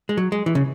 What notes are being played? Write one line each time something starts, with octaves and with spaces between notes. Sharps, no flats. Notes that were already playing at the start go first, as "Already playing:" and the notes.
G#3
F#3
G#3
E3
C#3